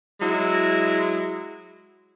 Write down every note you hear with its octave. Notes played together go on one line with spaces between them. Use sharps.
F#3 G#3 E4